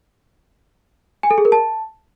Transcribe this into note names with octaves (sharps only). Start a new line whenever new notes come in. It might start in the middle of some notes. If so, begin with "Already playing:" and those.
G#5
A4
G#4
A#4
A5